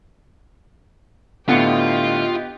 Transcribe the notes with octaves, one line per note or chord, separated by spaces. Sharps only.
A2 D3 B3 F4 G4 D#5 C#7